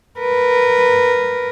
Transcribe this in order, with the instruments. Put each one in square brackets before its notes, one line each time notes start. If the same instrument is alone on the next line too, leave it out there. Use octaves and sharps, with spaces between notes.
[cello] A#4 B4